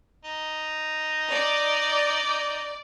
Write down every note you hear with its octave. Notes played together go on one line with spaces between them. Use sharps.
D#4
D5